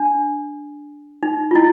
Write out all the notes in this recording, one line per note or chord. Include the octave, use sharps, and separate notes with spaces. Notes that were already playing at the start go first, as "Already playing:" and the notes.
Already playing: D4
D#4
F4
E4